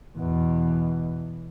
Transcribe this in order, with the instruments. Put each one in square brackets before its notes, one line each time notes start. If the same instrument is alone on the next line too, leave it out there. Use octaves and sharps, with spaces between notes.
[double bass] E2 B2